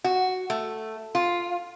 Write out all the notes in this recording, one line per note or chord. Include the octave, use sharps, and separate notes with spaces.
F#4
A3
F4